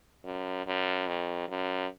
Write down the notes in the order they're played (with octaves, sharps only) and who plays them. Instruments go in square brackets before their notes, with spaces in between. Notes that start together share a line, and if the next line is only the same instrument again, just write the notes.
[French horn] F#2
F#2
F2
F#2